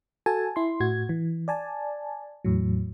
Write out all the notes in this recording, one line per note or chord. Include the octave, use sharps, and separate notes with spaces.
F#4 A4 G#5 A5
E4 C6
A2 F#4 G#6
E3
D5 G#5 A5
E2 A2 F#3